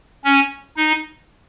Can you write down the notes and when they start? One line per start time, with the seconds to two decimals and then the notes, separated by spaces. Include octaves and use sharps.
0.24 C#4
0.77 D#4